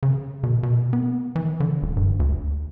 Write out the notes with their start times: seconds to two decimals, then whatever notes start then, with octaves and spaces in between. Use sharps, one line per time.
0.03 C#3
0.43 B2
0.63 B2
0.93 B3
1.36 E3
1.60 D3
1.82 D#1
1.97 G2
2.20 D2